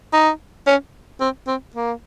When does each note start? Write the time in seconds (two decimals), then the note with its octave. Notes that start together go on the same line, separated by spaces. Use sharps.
0.13 D#4
0.67 C#4
1.21 C4
1.47 C4
1.76 A#3